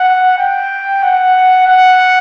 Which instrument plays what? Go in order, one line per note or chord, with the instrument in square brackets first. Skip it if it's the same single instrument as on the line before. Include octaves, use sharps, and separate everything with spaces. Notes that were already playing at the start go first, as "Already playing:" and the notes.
Already playing: [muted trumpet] F#5
G5
F#5
F#5